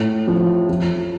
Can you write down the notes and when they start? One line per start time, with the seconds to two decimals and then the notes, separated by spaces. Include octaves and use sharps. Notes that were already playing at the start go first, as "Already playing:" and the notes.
Already playing: A2
0.27 F3
0.69 F3